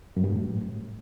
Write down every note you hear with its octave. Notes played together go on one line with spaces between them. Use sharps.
F#2
G2
A2